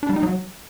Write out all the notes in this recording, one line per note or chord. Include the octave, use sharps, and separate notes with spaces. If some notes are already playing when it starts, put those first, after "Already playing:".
D4
G3
D#4
F#3